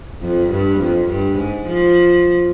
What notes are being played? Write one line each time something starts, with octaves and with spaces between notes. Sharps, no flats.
F2
G2
F2
G2
G#2
F3